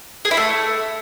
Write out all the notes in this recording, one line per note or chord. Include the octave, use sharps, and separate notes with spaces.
G#4
E4
A3